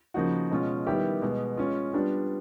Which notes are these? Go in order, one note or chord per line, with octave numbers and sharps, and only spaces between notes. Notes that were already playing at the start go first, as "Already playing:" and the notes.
C#3 F3 A#3 D#4 F#4
B2 G#3 C#4 F4
D#3 G3 B3 E4 G4
B2 G#3 B3
G#3 C#4 F4
G3 B3 D4 F4